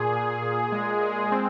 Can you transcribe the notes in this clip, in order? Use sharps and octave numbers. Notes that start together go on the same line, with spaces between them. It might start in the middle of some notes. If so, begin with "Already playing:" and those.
Already playing: A#2 G#4
A#2
A#2
G#3
G#3
C4